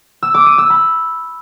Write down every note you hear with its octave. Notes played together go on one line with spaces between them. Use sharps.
E6
D6
D#7
E6
B5